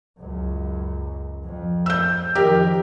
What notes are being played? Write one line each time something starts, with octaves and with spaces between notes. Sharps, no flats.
C#2 F#2
F2
E6 G6
F2 D#3 G4 A#4